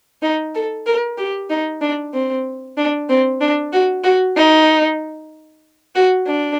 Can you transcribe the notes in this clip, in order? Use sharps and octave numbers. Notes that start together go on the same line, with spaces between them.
D#4
A4
A#4
G4
D#4
D4
C4
D4
C4
D4
F#4
F#4
D#4
F#4
D4